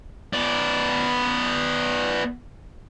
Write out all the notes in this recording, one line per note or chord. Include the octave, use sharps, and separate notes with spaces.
B3 D5